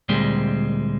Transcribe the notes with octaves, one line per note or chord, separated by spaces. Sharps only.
D2 A#2 G3 G#3 C4